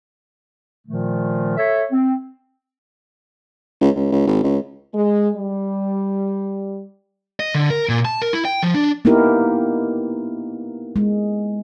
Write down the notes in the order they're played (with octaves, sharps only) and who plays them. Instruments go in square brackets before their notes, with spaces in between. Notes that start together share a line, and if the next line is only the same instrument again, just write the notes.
[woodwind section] A#2 D#3 F3 A3
A4 C#5 E5
C4
[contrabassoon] C#2
C#2
C#2
G#1
C#2
[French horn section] G#3
G3
[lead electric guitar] D#5
D3
A#4
A#2
A5
A#4
E4
G5
F3
D4
[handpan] A#3 B3 D#4 E4 G4 A#4
G#3